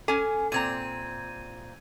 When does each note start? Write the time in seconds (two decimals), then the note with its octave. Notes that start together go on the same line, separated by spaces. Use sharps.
0.08 C#4 A4 G#5
0.52 A#2 C4 A#5 G#6 D#7